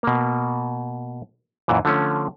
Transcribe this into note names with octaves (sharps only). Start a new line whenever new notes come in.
B2 A#3
F#2 A#2 E3
D3 F3 A3 C#4